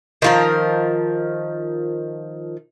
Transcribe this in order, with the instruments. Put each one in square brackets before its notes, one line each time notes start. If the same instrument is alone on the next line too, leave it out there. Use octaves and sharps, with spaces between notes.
[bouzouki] D#3 F3 A#4